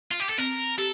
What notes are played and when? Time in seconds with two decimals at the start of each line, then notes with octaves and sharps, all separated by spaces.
0.11 F4
0.20 G4
0.29 A4
0.38 C4 A#4
0.78 G4 A4